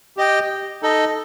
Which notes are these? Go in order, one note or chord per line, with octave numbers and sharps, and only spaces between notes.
G4 D#5 G5
D#4 A4 D#5